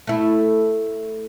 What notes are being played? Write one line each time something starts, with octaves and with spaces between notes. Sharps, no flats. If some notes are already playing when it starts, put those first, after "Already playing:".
A3 E4